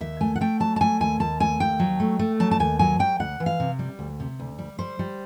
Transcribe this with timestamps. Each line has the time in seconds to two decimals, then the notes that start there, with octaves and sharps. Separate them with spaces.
0.01 D#2 E5
0.21 A3 G#5
0.36 F#5
0.41 A3 G5
0.60 F#3 A5
0.76 A5
0.81 A3 G#5
1.00 D#2 G#5
1.20 D#2 A5
1.40 A3 G#5
1.60 D#2 G5
1.79 F#3
2.00 A3
2.19 A3
2.40 F#3 A5
2.51 A5
2.60 D#2 G#5
2.79 F#3 G#5
2.99 F#3 G5
3.19 D2 F#5
3.40 E3
3.46 F5
3.60 C3
3.79 G3
3.99 D2
4.20 C3
4.40 D2
4.58 G3
4.79 G3 C5
4.99 G3